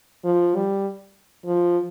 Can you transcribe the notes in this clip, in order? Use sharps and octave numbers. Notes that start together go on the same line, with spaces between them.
F3
G3
F3